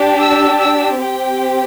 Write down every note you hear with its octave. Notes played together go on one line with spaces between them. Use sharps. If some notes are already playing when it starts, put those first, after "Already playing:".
Already playing: D4 G4
E6
E6
C4 G4 G5